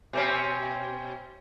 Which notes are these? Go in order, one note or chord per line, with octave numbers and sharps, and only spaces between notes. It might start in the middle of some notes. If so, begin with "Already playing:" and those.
B2 C4 C#4